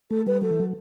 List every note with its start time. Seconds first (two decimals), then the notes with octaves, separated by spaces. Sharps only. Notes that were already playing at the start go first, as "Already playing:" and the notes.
0.10 A3 A4
0.27 G3 B4
0.42 F#3 A4
0.51 E3
0.60 F#3